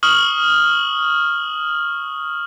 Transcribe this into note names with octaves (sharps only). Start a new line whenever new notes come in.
C#6 D#6 F6 F#7